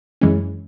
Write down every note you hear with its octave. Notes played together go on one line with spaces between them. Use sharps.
F#2 E3 G#3 C#4